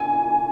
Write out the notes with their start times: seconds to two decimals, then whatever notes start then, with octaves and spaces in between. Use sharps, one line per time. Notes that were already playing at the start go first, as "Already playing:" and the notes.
Already playing: G#5